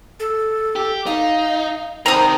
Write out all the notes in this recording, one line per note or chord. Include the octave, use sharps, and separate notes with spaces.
A4
G4
D#4 F5
C3 D#3 C5 A#5 D#6